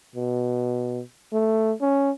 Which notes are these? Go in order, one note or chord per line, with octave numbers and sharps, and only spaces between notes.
B2
A3
C#4